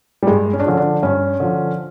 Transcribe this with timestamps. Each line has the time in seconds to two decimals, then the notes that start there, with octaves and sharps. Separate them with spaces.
0.23 G3
0.27 G2 G#3
0.53 C#4
0.60 D4
0.66 D3 F3 C#4
0.77 D4
1.03 G2 C#4
1.40 D3 F3